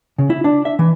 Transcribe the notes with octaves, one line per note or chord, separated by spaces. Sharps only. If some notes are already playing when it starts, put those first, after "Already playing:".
C#3
E4
D4
E5
E3